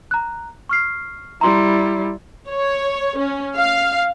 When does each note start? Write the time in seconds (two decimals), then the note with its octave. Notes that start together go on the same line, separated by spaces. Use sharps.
0.11 A#5 F#6
0.69 C#6 F6 C7
1.41 G3 E4 A#5 C6
2.48 C#5
3.18 C#4
3.56 F5